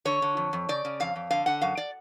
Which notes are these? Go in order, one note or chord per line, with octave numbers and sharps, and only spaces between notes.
D3 C#5
D3
F2
F2
C#3 D5
C#3
F2 F5
F2
D3 F5
D3 F#5
F#2 F5
D5